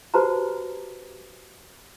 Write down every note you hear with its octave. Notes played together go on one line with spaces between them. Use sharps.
F#4 G4 B4 C5 A5 A#5